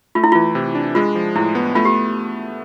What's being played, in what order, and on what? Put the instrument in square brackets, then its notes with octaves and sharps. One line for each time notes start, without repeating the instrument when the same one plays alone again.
[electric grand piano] A3 [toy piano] F4
[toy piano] E4
[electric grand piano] E3 [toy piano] F4
[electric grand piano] C3
D4
[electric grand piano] G#3 [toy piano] F4
[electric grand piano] F3
[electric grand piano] A2 [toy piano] E4
[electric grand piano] B3
[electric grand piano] A3 [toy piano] F4
[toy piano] G4